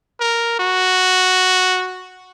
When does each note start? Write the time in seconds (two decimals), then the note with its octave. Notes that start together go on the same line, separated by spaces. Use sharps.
0.20 A#4
0.59 F#4